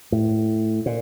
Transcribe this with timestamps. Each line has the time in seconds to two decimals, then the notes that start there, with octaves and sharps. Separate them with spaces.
0.12 A2
0.86 A#2